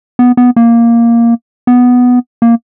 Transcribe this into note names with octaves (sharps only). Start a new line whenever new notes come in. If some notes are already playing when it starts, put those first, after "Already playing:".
B3
B3
A#3
B3
A#3